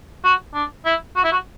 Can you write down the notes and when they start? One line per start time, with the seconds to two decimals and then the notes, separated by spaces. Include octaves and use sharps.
0.24 F#4
0.54 D4
0.85 E4
1.16 F#4
1.24 E4
1.32 F#4